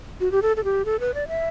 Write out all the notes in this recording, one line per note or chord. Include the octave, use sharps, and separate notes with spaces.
F#4
G4
A4
A4
G4
A4
B4
D5
E5